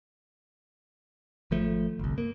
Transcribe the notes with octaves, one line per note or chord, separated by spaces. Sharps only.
G#1 F3 A3
G1 C2
A#3